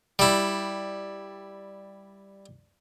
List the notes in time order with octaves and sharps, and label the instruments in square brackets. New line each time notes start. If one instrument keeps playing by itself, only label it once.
[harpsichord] G3 E4